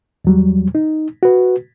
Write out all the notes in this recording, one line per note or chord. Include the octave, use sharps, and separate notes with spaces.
E2 F#3 G3
D#4
F#4 B4